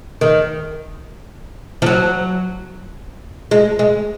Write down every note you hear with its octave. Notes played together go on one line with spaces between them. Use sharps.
D#3
F3
F#3
G#3
G#3